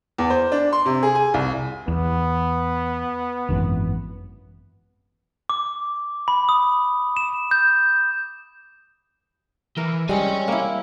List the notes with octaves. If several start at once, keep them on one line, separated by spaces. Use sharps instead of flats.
E2
C5
D4
C6
C3
G#4
G#5
C2
E2 B3
G#1 F#2 E3
D6
B5
D#6
E7
G6
E3 A#4
G3 G#3 C4 C#5 G#5
A#3 E4